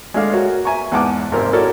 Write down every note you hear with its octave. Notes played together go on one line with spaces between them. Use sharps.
G#3 A3 D4 E5 F5
F#4 A#4 C#5
E5 G#5 A#5 C#6
E2 G#2 F#5 A5 D6
G#1 C3 A#3 C4 A#4
E4 F#4 A4 A#4 C#5 D5